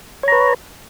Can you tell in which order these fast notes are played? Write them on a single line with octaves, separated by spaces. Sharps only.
C#5 A#5 B4